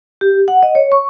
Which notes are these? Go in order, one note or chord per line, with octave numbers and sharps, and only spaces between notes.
G4
F#5
D#5
C#5
C#6